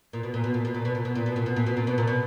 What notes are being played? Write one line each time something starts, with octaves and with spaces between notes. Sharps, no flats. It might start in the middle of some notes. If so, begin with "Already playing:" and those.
A#2
B2
A#2
B2
A#2
B2
A#2
B2
A#2
B2
A#2
B2
A#2
B2
A#2
B2
A#2
B2
A#2
B2